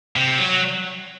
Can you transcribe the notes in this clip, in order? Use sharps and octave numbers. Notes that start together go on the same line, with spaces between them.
C3
F#3